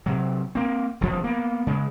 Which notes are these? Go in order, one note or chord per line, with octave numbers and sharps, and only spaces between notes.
C3 F#3
A#3 C4
E1 C2 D3 F3
A#3 B3
C#3 G#3